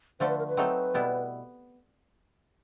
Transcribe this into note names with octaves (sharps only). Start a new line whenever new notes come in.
D3 F3 A3 C5
B4
A#4
B4
F#3 A3 C4 D#4
B2 G3 B3 E4